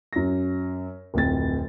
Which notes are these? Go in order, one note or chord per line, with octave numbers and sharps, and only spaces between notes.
F#2 A#6
D1 F2 A6